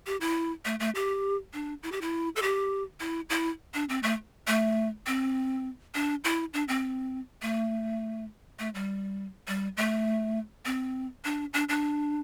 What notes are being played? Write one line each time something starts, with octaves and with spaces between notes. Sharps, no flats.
G4
E4
A3
A3
G4
D4
E4
G4
E4
A4
G4
E4
E4
D4
C4
A3
A3
C4
D4
E4
D4
C4
A3
A3
G3
G3
A3
C4
D4
D4
D4